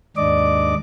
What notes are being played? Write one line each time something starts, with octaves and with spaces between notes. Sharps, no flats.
D#2 G#2 D4 D5 D#5 D6